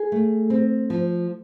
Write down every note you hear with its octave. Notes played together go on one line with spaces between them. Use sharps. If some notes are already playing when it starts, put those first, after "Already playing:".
Already playing: G#4
A3
C4
F3